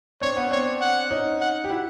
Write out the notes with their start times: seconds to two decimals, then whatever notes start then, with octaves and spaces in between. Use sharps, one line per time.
0.21 C4 D4 C#5
0.36 B3 C#4
0.51 C4 D4 C#5
0.81 F#5
1.11 C#4 D#4
1.41 F#5
1.64 G4
1.70 E4 F#4